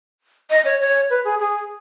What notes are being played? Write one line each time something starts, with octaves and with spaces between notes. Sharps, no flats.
D#5
C#5
C#5
B4
G#4
G#4